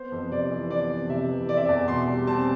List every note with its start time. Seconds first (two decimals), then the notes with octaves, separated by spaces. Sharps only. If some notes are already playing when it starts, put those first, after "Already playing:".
Already playing: B3 C5
0.12 F2
0.31 C3 D5
0.51 E3
0.70 B3 D5
0.91 F2
1.10 C3 E5
1.29 E3
1.49 C4 D5
1.57 E5
1.65 E2 D5
1.88 B2 C6
2.07 G3
2.27 C4 A5